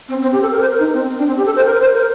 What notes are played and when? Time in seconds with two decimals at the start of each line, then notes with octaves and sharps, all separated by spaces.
0.09 C4
0.22 C4
0.33 G4
0.42 A4
0.52 A#4
0.61 C5
0.70 A#4
0.79 D#4
0.93 C4
1.09 C4
1.18 D4
1.27 C4
1.37 G4
1.46 A4
1.56 C5
1.66 A#4
1.80 C5
1.94 A#4